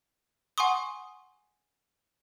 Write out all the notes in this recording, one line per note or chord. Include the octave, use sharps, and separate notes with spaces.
F#5 G#5 C6 C#6 D#6